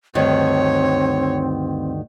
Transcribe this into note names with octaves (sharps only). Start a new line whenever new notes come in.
D2 G2 D#3 C4 C#5